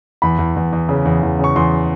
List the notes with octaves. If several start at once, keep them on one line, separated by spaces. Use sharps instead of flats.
E2 B5
E2
E2
E2
C#3
E2
E2
C#3 C#6
E2 C6